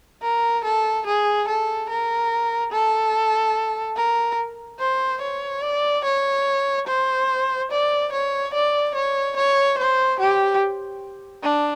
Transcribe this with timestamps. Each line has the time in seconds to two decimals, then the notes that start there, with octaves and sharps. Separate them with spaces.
0.23 A#4
0.64 A4
1.07 G#4
1.48 A4
1.89 A#4
2.72 A4
3.97 A#4
4.80 C5
5.21 C#5
5.62 D5
6.04 C#5
6.87 C5
7.71 D5
8.12 C#5
8.54 D5
8.95 C#5
9.36 C#5
9.78 C5
10.20 G4
11.43 D4